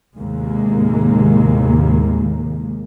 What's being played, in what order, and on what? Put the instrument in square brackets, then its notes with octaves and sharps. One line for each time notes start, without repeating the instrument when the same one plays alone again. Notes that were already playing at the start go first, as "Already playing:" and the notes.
[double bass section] D#2 A2 C3 D#3 G#3 A#3